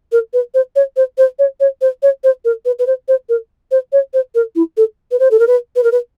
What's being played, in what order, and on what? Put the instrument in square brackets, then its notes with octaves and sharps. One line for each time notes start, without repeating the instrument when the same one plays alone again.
[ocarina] A#4
B4
C5
C#5
C5
C5
C#5
C#5
C5
C#5
C5
A#4
B4
B4
C5
C5
A#4
C5
C#5
C5
A#4
E4
A4
B4
C5
A4
A#4
B4
B4
A#4
B4